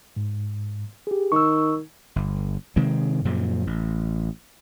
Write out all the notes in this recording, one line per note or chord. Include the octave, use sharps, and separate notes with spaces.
G#2
G4 G#4
D#3 C#6 E6
G1
C3 D#3 G#3 C4
F#2 A#2 C#3 F3
A1